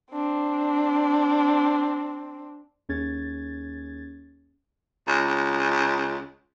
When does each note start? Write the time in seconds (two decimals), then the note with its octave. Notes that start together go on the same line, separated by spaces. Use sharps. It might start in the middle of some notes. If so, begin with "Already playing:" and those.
0.12 C4 D4
2.89 D#2 C#4 G#4 G#6 A6
5.08 C#2